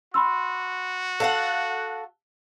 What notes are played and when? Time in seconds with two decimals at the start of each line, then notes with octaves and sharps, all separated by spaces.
0.14 F#4 B5 C6 E6
1.20 A4 F5 F#5